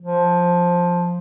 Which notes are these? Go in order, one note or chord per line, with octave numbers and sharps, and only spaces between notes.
F3